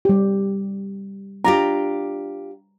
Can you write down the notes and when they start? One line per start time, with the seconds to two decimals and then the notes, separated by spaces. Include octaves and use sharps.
0.05 G3 G4
1.45 D4 F4 G4 A#5